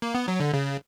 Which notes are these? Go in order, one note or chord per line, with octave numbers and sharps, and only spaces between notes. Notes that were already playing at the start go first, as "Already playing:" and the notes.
A#3
B3
F#3
D3
C#3